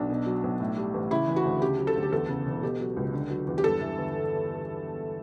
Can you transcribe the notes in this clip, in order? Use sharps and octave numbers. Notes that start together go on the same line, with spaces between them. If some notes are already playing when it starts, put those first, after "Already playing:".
Already playing: B1 D4
B2
F#3
B1
A2
G3
A1
C#3 E4
E3
F#4
D2
C#3 G4
F#3
A4
D2
G4
E2 A4
C#3
E1
B2 G4
F#3
C#2
D3
F#3
E2
G4
G2 A4
E3
G1